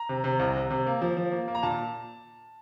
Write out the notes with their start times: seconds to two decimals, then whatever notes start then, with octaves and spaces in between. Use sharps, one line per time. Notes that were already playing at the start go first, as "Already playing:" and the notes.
Already playing: A#5
0.09 C3
0.24 C3
0.39 C2
0.56 C3
0.71 C3
0.86 A#3
1.02 F3
1.17 F3
1.32 A#3
1.48 A#3
1.55 A#5
1.63 A#2 A5